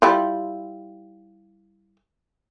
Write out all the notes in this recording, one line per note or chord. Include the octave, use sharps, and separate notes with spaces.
G3 E4 F4